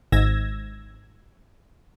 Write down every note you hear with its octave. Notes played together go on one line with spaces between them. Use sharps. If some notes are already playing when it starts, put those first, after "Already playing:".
G#1 G#2 E6 G#6 A#6